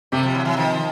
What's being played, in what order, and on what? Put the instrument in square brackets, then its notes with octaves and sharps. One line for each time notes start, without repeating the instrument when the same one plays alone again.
[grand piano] C3 [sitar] G3 A3
[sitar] F3 G3
E3 F#3
E3 F#3
D#3 F3